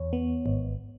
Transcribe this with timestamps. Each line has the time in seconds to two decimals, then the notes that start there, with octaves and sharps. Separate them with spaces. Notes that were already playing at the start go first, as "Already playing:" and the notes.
Already playing: E2 C#5
0.13 B3
0.46 G#1